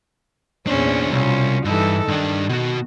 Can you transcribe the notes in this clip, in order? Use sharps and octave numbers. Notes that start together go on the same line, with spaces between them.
E2 A#2 C#4 D4 C5
C2 B2 C#4 F4
G2 E3 D#4 A4
G2 D#3 D4
B2 F#4